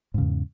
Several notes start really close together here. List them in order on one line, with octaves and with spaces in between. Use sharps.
G#2 C#3 E2